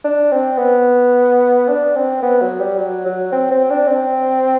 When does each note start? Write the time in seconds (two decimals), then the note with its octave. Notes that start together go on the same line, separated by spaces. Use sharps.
0.04 D4
0.31 C4
0.58 B3
1.68 D4
1.96 C4
2.23 B3
2.41 F#3
2.60 G3
2.78 F#3
3.06 F#3
3.32 C4
3.51 C4
3.70 D4
3.87 C4